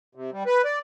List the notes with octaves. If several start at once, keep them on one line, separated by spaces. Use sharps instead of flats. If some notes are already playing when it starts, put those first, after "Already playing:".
C3
G3
B4
D5